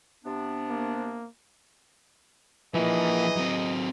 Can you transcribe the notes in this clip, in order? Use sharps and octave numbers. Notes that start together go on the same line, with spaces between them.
C3 B3 D4
A#3
E3 F3 A#3 D#4 G#4 D#5
F#3 C4